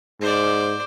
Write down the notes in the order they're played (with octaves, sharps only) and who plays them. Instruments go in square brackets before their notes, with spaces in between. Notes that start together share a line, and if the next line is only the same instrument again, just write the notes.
[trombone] G#2 [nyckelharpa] C5 D5